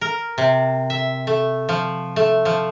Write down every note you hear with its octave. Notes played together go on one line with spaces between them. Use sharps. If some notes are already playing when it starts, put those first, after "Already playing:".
A#4
C3
E5
A3
F3
A3
F3